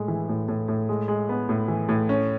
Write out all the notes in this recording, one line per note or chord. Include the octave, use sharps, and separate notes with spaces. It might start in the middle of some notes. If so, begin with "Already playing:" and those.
Already playing: A2 G#3
E3
A2
A2
A2
G#3
G#3
B3
A2
E3
A2
C#4